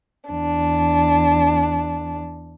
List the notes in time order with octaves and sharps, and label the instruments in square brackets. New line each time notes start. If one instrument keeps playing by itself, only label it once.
[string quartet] E2 D4